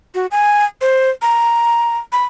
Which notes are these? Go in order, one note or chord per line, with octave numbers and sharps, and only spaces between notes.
F#4
G#5
C5
A#5
B5